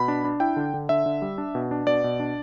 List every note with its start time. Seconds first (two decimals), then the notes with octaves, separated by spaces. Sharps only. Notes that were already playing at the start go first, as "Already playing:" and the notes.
Already playing: B2 B5
0.08 D4
0.25 D4
0.40 E4 G5
0.56 D3
0.74 D3
0.89 D3 E5
1.06 D3
1.22 G3
1.38 D4
1.55 B2
1.71 D4
1.87 B2 D5
2.04 B2
2.20 D4